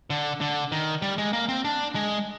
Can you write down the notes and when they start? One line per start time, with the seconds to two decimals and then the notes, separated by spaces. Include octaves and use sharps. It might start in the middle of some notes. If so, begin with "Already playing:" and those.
0.10 D3
0.41 D3
0.72 D#3
1.02 G3
1.18 G#3
1.33 A#3
1.49 C4
1.65 D4
1.95 G#3